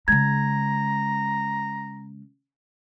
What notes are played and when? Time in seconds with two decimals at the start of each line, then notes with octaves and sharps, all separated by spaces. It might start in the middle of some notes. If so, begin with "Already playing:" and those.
0.08 C#3 G#3 A#5 G#6